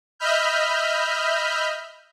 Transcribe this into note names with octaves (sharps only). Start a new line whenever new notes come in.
D#5 E5 B5 F6 G6